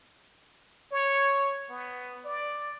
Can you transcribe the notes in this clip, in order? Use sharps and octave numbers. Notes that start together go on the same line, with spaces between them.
C#5
B3
D5